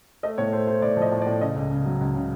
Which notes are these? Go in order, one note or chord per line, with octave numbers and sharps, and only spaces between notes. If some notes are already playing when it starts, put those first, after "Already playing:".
A3 D#5
A2 C#5
A3 C5
A3 C5
A2 D5
F3
D#5
A2
D5
A2
C#3 D#5
C#2
C#3
F#3
C#2
C#3